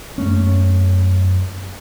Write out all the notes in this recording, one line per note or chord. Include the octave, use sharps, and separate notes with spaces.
F#2 A3 C#4